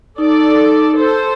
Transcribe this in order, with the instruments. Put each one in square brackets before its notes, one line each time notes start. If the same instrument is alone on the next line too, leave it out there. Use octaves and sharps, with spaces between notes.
[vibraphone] D#4 [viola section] A4 D5
[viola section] A4 C5